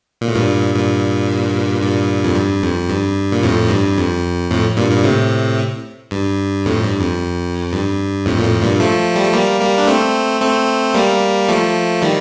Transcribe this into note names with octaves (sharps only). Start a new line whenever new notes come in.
A#2
A2
G2 A#2
G2 A#2
G2 A#2
F2
G2
F2
G2
A#2
F2 A2
G2
F2
F2 A2
G2 A#2
G2 A#2
A2 C3
G2
F2 A2
G2
F2
G2
F2 A2
A#2
F2 A2
G2 A#2
F3 A3
G3
A3
G3 A#3
G3 A#3
D4
A3 C4
A3 C4
G3 A#3
F3 A3
D#3 G3